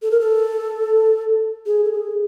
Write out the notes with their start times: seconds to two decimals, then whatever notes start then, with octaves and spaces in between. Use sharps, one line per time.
0.02 A4
0.11 A#4
0.20 A4
1.66 G#4
1.84 A4
1.93 G#4